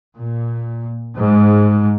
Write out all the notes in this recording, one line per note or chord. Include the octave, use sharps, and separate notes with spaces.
A#2
G#2